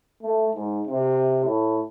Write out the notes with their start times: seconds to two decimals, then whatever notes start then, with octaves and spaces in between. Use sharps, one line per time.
0.23 A3
0.55 G#2
0.88 C3
1.44 A2